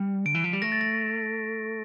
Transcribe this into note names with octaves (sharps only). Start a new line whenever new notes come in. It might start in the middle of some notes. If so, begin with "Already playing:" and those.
Already playing: G3
D3 D7
E3
F3
G3
A3 A#6
A6
A#6